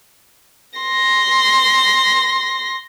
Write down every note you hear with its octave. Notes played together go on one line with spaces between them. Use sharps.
C6 A#6